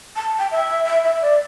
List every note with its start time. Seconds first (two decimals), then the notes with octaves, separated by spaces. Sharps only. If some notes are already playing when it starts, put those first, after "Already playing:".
0.16 A5
0.39 G5
0.51 E5
0.86 E5
1.04 E5
1.22 D5